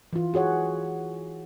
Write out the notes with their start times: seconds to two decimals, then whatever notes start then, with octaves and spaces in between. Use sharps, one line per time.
0.13 E3 F4
0.34 F#4 G#4 C#5 F#5